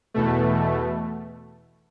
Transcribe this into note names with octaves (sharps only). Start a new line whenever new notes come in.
E2 B2 A3